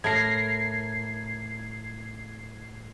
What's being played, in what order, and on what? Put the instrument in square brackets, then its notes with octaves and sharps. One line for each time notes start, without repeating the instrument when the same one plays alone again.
[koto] A2 A#4 [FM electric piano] G#6 C7